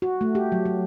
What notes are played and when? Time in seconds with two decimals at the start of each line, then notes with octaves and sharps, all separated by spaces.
0.02 F#4
0.21 A3
0.35 G4
0.52 F#3
0.66 F#3